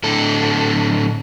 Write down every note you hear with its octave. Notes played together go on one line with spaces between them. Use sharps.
A2 D3 A4